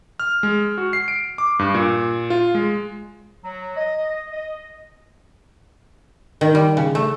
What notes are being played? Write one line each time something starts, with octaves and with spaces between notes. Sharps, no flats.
F6
G#3
F#4
C7
D7
D6
G2
A#2
F4
G#3
F#3
D#5
D#5
D#3
G3
C#3
A3